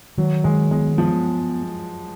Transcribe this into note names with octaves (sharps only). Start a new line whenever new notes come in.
D#3 F#3
D#3 G#3
G#3 B3
F3 B3